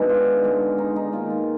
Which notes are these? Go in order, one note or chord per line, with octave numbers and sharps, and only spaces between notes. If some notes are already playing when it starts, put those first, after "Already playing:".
Already playing: B2 G#3 D4 D#4
F4
D3 G#3 D4
D#4
D#4
D#3 A#3 D#4 F4
F4